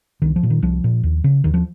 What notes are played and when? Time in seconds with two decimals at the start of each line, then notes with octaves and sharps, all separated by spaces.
0.22 C2 D#3
0.36 F3
0.43 A#2
0.50 D#3
0.62 C2 F3
0.84 A#2
1.04 D#2
1.24 C#3
1.44 D#2 D#3
1.54 F3